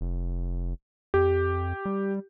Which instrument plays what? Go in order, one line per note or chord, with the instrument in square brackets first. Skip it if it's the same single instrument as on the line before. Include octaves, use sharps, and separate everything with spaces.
[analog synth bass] F1
[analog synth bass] F2 [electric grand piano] G4
[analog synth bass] G3